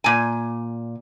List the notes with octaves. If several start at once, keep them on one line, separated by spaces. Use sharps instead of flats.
A#2 G#5